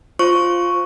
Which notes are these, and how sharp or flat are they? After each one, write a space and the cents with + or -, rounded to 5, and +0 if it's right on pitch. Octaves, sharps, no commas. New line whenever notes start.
F4 +0 C5 +0 C#6 +0